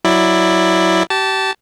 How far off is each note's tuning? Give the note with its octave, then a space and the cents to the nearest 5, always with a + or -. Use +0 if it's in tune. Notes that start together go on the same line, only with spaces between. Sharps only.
F#3 +0 E4 +0 D5 +10
G4 -30 A5 +0